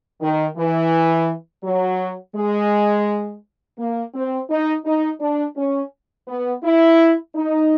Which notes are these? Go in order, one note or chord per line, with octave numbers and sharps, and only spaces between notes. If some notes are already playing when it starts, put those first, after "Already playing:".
D#3
E3
F#3
G#3
A#3
C4
D#4
D#4
D4
C#4
B3
E4
D#4